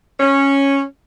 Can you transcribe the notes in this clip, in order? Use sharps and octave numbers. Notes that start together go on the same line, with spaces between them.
C#4